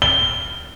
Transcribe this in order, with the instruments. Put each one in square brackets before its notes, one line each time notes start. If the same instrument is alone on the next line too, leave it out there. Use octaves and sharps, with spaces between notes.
[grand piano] G7